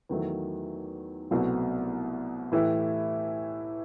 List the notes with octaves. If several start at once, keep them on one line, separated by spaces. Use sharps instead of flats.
E2 D#3 F#3 A3
C2 B2 F#3 A3 C4
A2 E3 A3 E4 G4